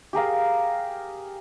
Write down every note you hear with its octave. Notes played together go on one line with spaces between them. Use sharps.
G4 G#4 A#4 F5